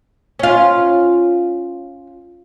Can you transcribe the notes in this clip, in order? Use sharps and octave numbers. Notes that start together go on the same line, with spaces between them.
C#4 F4